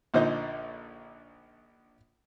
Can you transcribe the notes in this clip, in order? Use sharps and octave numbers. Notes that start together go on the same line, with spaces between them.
A#1 A#2 D3 D#4 C5 D#5